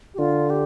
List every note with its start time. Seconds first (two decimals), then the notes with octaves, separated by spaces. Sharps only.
0.14 G4
0.18 D3 F4
0.50 G4